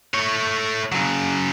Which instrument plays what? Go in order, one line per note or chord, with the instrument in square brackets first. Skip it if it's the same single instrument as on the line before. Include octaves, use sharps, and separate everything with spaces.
[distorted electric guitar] A3 C#5
C#3 F#3